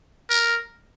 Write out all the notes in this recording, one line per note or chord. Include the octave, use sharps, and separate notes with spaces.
A#4